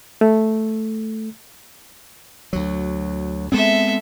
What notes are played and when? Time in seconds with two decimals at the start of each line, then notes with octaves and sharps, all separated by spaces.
0.21 A3
2.53 D2 F#3
3.52 G#3 B3 C4 A4 E5